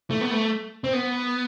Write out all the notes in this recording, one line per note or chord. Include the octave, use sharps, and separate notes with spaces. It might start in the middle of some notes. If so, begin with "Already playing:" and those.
A3
B3
A3
C4
B3